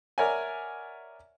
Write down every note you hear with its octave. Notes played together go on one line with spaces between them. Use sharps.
A#4 C#5 D5 E5 F#5 G#5